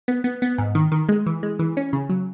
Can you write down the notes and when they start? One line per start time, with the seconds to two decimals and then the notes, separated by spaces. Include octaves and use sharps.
0.08 B3
0.24 B3
0.42 B3
0.58 G#2
0.75 D#3
0.92 D#3
1.09 G#3
1.26 E3
1.43 G#3
1.59 E3
1.77 C#4
1.93 C#3
2.09 F#3